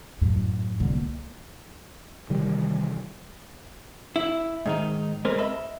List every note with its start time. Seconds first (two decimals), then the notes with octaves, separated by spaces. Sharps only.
0.21 F#2 A2
0.80 C#2 D3
0.92 A#3
2.30 C3 D#3 E3 G3
4.16 E4
4.66 G#2 D#3 D#4
5.25 G#3 C4 A#4 B4
5.38 D#5 E5 B5